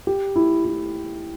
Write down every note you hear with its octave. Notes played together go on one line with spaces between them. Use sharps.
G4
E4
E4